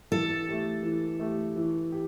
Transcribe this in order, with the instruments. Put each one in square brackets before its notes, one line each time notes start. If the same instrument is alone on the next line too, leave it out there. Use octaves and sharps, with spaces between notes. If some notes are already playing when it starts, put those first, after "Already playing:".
[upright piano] E3 [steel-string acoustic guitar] A4
[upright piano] A3 G4
E3
A3 G4
E3
G4